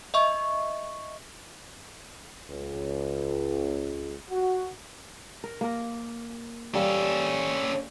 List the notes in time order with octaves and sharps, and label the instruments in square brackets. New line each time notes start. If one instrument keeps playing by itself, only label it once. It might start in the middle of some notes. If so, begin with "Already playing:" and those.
[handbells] D#5 E5 C#6
[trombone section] C#2
F#4
[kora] A#4
A#3 A#4
[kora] G3 A#3 [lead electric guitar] C#4 A4